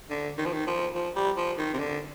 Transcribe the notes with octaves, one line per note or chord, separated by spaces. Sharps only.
D3
D#3
F3
D#3
F3
F3
G3
F3
D#3
C3
D3